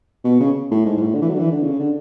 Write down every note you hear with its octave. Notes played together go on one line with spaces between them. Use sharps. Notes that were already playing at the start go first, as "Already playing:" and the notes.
B2
C#3
A2
G#2
G#2
A2
D3
E3
F#3
D3
E3
D3
C#3
D3